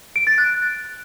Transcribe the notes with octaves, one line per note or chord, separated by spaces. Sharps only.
D7
A6
F#6